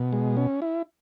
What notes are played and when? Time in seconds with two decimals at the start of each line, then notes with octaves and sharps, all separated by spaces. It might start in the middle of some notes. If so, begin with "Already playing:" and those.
Already playing: B2
0.13 G#3
0.37 C#4
0.62 E4